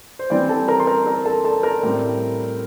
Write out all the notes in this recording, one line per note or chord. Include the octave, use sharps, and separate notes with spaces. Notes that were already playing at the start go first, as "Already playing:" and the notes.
C5
E3 G3 C4 D5
A4 A5
A#4 A#5
C6
A#4 A#5
A#4 A#5
A4 A5
A4 A5
A#4 A#5
A2 G3 C4